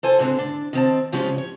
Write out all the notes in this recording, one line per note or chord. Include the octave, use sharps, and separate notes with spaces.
A4 C5 G#5 A5
G#2 D3 C4
D4
D#3 C4 A5
G#2 C#3 F3 G#3 C#4 G4
C#5